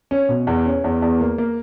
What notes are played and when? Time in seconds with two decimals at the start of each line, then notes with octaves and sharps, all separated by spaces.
0.11 C#4
0.29 B2
0.47 E2
0.66 C#4
0.84 E2
1.02 E2
1.20 A#3
1.38 A#3